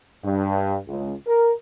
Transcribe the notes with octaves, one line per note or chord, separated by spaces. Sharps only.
G2
C#2
A#4